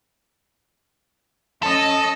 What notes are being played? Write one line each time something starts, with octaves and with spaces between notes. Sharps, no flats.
C#4 A4 D#5